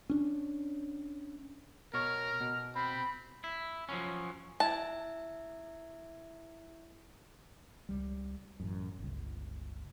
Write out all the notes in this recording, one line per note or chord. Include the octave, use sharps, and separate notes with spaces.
C#4 D4
B2 A#4 C#5 F6
B2
C4 B5
E4
F3 F#3 C#4
E4 E5 A5 G#6
C#2 G3
A1 F#2
G1 C#2